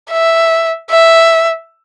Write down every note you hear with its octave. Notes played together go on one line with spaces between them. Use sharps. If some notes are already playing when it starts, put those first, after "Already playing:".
E5
E5